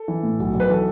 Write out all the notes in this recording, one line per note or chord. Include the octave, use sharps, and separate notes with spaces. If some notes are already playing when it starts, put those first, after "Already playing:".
Already playing: A4
E3
A2
B1
B1
B4
E3 A4